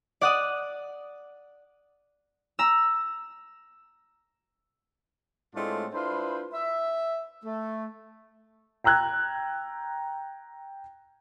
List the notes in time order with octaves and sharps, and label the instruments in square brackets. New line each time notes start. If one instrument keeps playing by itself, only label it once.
[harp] D5 F#5 D#6
A#5 E6
[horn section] A2 G#3 A3 C4 D4 F4
D4 E4 F4 B4 C5
E5
A3
[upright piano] G5 A#5 E6 F#6 G#6